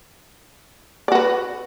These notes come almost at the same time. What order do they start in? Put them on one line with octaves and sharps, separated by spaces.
D5 F#4 B4